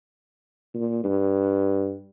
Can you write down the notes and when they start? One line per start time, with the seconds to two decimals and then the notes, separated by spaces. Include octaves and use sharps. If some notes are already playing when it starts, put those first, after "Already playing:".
0.74 A#2
1.04 G2